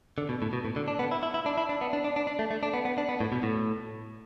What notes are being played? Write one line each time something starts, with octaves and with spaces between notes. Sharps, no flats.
D3
B2
A2
B2
A2
D3
D4
B3
E4
E4
E4
D4
E4
D4
B3
D4
D4
D4
D4
A3
A3
D4
B3
B3
D4
B3
A2
B2
A2